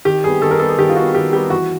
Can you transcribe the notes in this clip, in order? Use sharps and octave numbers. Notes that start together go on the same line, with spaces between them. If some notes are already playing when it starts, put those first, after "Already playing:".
D#3 G4
G3 B3 G#4
D#3 A4
A#4
G3 B3 A4
G#4
D#3 G4
F4
G3 B3 F#4
D#3 G4
G3 B3 G4
E3 F#4